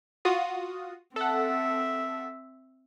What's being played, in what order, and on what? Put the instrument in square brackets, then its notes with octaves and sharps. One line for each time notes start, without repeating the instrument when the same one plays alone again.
[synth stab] F4 F#4 D#6
[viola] C4 E5 [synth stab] A4 F#5